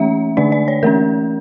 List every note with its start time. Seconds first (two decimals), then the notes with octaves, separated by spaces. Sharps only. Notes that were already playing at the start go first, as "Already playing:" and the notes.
Already playing: E3 A3 C#4 E5
0.37 D3 A3 D4 D5
0.52 D5
0.68 C#5
0.83 E3 A3 C#4 A#4